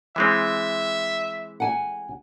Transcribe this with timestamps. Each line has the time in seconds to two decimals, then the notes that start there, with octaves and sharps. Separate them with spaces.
0.16 E3 G#3 C4 E5
1.60 F#5 G#5